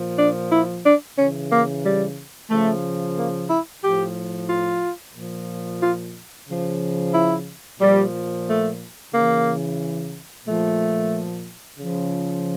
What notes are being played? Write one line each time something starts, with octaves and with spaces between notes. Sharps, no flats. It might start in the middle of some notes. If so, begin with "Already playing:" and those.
Already playing: A#2 F3
D4
E4
D4
C#3 E3 C#4
A#3
G3
C#3 F3 A3
A#3
E4
A2 F3 G4
F4
A#2 F3
F4
C#3 F3
E4
A#2 F3 G3
A3
C#3 E3 A#3
A#2 F3 A3
C#3 F3